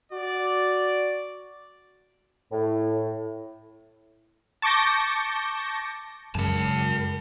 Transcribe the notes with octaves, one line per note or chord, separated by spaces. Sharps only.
F#4 D5
A2
A5 C#6 D6 G6 A#6
F#2 C#3 G#3 A#4 A5